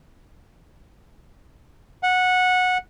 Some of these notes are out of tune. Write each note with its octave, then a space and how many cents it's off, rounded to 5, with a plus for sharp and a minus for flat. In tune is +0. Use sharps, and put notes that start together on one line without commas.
F#5 -15